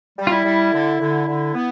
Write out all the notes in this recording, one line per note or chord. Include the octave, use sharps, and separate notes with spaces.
G3
F4
E4
G3
D3
D3
D3
B3